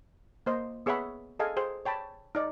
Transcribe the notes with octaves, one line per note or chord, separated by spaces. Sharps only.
A#3 C5 D#5
B3 G#4 C#5 E5 F#5 B5
G#4 A4 D#5 F5 G#5
G#4 C5 G5
C#5 G5 A5 B5
D#4 D5